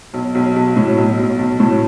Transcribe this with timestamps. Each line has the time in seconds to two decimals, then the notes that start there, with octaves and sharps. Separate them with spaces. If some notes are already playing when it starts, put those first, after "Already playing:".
0.14 B1
0.35 B1
0.56 B1
0.77 A2
0.98 B1
1.19 B1
1.39 B1
1.60 A2